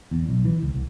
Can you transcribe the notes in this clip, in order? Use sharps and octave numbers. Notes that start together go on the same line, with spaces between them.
E2
B1
E3
C#2
C2